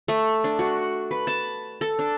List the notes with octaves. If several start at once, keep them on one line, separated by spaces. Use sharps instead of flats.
A3
D4
F#4
B4
A5
A4
D4